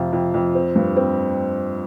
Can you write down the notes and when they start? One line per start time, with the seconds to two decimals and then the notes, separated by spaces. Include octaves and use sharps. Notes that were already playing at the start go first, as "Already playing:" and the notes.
Already playing: F2 C3 F4
0.13 F2
0.34 F2
0.55 C4
0.76 G2
0.97 C4